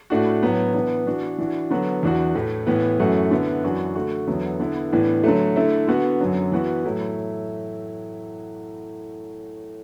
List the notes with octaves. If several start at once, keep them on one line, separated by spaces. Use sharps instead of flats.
A2 A3 D4 F#4
A2 F#3 B3
E3 B3 D4
E3 D4 F#4
E3 D4 F#4
D3 F#3 B3 F#4
E2 E3 D4 F#4
A2 E3 A3
A2 E3 B3
F#2 E3 A3 F#4
D3 B3 E4
F#2 E3 D4 F#4
D3 A3 F#4
E2 D3 F#3 B3 E4
D3 B3 E4
A2 E3 B3 D4
D3 F#3 A3
D3 A3 E4
D3 B3 F#4
F#2 D3 F#3
E3 B3 F#4
A2 F#3 A3 E4